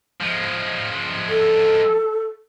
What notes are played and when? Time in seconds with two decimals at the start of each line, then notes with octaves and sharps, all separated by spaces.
0.20 F3 G#3
1.28 A4